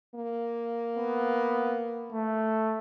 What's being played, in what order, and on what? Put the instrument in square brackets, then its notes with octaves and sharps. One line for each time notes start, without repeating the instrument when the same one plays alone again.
[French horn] A#3
[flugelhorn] B3
A3